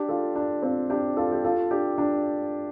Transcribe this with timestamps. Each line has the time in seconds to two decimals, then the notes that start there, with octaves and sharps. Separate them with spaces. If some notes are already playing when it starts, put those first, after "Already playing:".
Already playing: D4 G4
0.09 F4 A4
0.35 D4
0.62 C4 F4
0.90 D4 G4
1.17 F4 A4
1.32 G4
1.44 F4 A4
1.71 D4 G4
1.98 D4